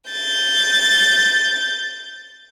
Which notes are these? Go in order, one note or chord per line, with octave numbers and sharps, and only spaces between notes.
G6 A6